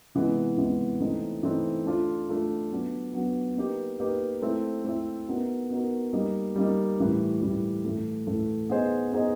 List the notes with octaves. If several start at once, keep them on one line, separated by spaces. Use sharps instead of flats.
C3 E3 G#3 B3
C3 E3 G#3 B3
E3 A3 C4 D#4
E3 A3 C4 D#4
A3 D4 F4
A3 D4 F4
F#3 B3 D4
F#3 B3 D4
A#3 D#4 G4 B4
A#3 D#4 G4 B4
A3 C4 E4
A3 C4 E4
B3 D#4 F#4 A#4
B3 D#4 F#4 A#4
G3 A#3 D#4
G3 A#3 D#4
A2 E3 G3
A2 E3 G3
A2 E3 A3
A2 E3 A3
B3 D#4 G#4 C5 D#5
B3 D#4 G#4 C5 D#5